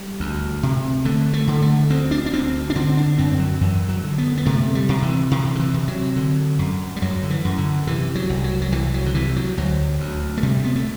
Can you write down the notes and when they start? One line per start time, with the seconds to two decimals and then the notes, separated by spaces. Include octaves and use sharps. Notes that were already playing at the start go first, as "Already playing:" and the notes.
Already playing: G3
0.20 D2
0.63 C3
1.05 D3 A3
1.33 A3
1.47 D3
1.62 A3
1.90 D2 C4
2.11 D4
2.26 D4
2.33 D2 C4
2.70 D4
2.76 D3 C4
2.97 D4
3.18 F#2 C4
3.39 F#3
3.61 F#2 E3
3.89 F#3
4.03 D3
4.18 B3
4.38 B3
4.46 C3 A3
4.75 G3
4.89 C3
5.03 E3
5.31 C3 E3
5.55 D3
5.60 E3
5.74 C3
5.88 F#3
6.16 D3
6.59 F#2
6.96 G3
7.02 F#2 F#3
7.23 D3
7.30 E3
7.45 F#2
7.58 D3
7.87 C3 E3
8.15 F#3
8.30 C2
8.44 F#3
8.62 F#3
8.72 C2 E3
8.94 F#3
9.06 D3
9.15 C3 E3
9.36 F#3
9.57 D2 F#3
10.00 D2
10.38 A3
10.43 C3 G3
10.64 B3
10.76 A3